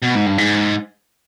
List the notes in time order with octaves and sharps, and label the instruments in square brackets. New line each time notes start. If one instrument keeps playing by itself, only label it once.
[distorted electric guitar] B2
G#2
G2
G#2